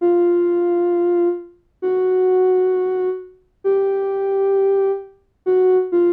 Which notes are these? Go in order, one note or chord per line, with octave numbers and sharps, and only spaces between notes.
F4
F#4
G4
F#4
F4